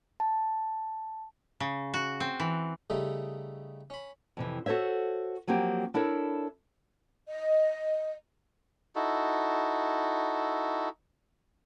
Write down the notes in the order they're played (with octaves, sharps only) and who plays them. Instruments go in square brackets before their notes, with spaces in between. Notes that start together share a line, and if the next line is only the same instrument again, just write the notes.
[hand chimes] A5
[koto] C#3
F#4
C4
E3
[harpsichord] C#3 G3 A3 D#4 A4
C#4 B5
[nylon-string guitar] F2 C3 E3
F#4 A4 C5 C#5 E5
F3 F#3 A#3 C4 G4
D4 E4 A4 A#4 C#5
[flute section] D#5
[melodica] D#4 E4 F#4 A4